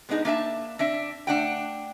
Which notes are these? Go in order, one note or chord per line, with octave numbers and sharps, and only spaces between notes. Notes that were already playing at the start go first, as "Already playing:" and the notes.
G#3 B3 D4 D#4 G#4
A#3 D4 E5 A5
C4 D4 E5
A3 D4 F#5 G5